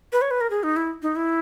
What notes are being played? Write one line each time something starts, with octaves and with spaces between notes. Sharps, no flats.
B4
C#5
B4
A#4
G#4
D#4
E4
D#4
E4